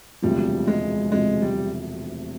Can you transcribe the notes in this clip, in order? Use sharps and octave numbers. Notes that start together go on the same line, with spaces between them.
E1 D2 C3 F3 G3
G#3
E1 D2 C3 F3 G#3
G3